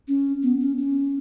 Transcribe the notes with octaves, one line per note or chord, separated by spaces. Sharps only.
C#4
B3
C#4
C#4